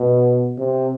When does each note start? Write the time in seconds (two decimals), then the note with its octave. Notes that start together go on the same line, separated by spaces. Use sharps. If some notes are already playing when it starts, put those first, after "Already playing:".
Already playing: B2
0.58 C3